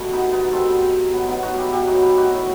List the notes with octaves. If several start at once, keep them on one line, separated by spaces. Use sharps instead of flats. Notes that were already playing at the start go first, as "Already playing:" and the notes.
Already playing: B2 G3 A3
B3 D#4
B3 D#4
B2 G3 A3 C4
B2 F#3 B3
B3 D#4
D#4 F#4
E4 G4
B2 F#3 E4 G4
D#4 F#4
E4 G4
D#4 F#4
A2 G3